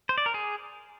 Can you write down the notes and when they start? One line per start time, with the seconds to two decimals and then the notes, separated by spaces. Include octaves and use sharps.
0.09 C5
0.18 D5
0.26 A#4
0.34 G#4